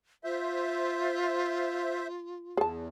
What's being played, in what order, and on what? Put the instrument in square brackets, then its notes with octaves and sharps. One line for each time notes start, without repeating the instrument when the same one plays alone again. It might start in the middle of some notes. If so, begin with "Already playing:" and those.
[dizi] F4 [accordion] C5 E5
[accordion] E2 [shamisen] G#4 A5